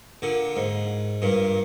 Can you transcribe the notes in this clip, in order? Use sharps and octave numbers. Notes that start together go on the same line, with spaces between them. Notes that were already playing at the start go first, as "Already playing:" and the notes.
A#2 D3
G#2
G2 A#2